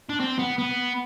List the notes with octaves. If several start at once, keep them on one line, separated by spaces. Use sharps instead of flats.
D4
C4
B3
B3